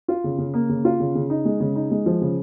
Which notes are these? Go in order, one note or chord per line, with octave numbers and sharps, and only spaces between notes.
F4
C#3
C#3
A#3
C#3
F4
C#3
C#3
D#4
G#3
C#3
D#4
G#3
F3
C#3